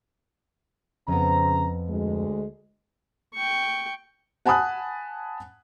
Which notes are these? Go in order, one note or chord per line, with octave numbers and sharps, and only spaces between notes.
F2 C#3 B3 C4 A#5
D2 G#3
G5 C#6
F#5 G#5 A5 B5 D#6 F#6